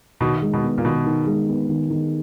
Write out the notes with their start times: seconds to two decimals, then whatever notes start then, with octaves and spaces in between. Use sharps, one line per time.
0.21 B2 D#3
0.42 G#3
0.54 B2
0.64 B3
0.78 A#2
0.85 B2 D#3
1.06 D#3
1.27 G#3
1.49 B3
1.69 D#3
1.91 D#3